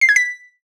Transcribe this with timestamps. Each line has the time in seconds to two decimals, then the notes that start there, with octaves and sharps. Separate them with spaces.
0.01 C7
0.09 G#6
0.16 B6